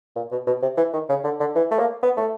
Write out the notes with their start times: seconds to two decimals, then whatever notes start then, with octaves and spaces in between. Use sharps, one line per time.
0.16 A#2
0.32 B2
0.47 B2
0.62 C3
0.78 E3
0.93 D#3
1.09 C#3
1.24 D3
1.40 D3
1.56 E3
1.71 A3
1.79 A#3
2.03 B3
2.17 A3